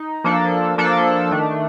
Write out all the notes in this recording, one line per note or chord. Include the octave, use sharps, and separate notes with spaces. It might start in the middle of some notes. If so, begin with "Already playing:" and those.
Already playing: D#4
F3 A#3 D4 A4
F3 A#3 D4 A4
D#3 A3 D4